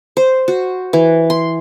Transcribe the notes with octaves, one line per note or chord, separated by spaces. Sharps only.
C5
F#4
E3
C6